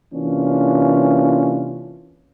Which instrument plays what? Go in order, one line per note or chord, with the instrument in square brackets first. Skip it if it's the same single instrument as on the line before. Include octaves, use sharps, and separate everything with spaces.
[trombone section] C3 E3 A#3 C#4 D4 F4